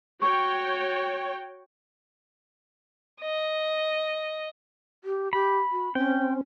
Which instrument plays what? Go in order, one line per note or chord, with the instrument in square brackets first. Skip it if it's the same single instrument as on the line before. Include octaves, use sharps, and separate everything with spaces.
[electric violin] F#4 [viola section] C#5 G5 [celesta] C#6
[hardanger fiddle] D#5
[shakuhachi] G4
[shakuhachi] G4 [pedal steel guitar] B5
[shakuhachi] F#4
[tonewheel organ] C4 [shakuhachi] C#4 [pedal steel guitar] G5